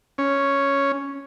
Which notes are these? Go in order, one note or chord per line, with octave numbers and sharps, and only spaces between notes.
C#4